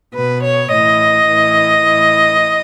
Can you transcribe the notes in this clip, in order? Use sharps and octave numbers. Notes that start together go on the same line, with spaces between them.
B2 B4
C#5
A2 E3 D#5
A2 E3
A2 E3